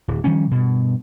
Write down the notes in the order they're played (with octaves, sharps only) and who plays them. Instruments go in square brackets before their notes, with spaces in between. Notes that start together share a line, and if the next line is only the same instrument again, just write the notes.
[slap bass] D1
D#3 F3 G3 C#4
G2 B2